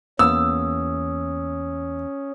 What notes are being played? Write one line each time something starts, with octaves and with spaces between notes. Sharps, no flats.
E2 A#3 B3 C#4 D#6 E6